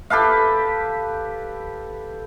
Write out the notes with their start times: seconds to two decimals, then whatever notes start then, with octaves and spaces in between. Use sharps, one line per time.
0.10 G4 A4 B4 F5